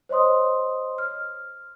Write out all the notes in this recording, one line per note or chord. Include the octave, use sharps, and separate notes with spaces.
C5 C#5 D#5 C6 D#6
F6